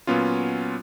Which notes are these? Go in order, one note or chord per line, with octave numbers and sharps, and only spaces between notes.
A#2 F#3 B3 C#4 F4